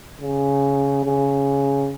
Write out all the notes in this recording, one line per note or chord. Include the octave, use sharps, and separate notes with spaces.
C#3
C#3